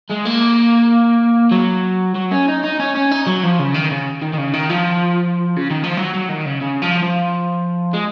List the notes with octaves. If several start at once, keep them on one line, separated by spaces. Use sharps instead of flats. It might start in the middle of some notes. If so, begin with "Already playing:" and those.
G#3
A#3
F#3
F#3
C#4
D#4
D#4
C#4
C#4
D#4
F#3
F3
C#3
D#3
C#3
D#3
D#3
C#3
D#3
F3
C#3
D#3
F3
F#3
F#3
D#3
C#3
C#3
F3
F3
G#3